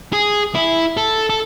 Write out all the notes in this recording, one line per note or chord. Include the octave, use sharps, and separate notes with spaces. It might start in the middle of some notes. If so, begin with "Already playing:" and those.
G#4
E4
A4
A4